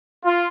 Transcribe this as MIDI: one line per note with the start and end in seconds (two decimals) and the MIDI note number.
0.25 0.46 65